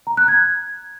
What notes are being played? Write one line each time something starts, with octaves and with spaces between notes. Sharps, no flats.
A#5
F#6
G#6